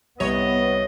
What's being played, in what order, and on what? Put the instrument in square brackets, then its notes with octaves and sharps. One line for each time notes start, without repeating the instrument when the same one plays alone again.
[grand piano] C2 [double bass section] B3 [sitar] C#5 [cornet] D#5